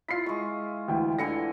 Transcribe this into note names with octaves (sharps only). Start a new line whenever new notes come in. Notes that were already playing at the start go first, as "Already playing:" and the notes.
E4 F4 B6 C7
G#3 C#6
D2 E3 G5
D3 E3 G#5 A#6 C#7